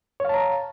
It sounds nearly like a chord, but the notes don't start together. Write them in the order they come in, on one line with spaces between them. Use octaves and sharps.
C#5 F5 A5 A#5